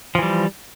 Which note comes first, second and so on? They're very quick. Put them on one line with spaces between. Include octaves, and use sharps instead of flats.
F3 E3 G3